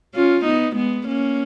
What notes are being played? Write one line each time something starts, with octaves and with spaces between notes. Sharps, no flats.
C#4 F4
B3 D#4
G#3 B3
A#3 C#4